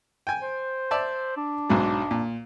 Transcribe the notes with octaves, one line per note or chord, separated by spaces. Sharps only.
G5 G#5
C5
D5 E5 A5
D4
B1 G#2 F#3
A#2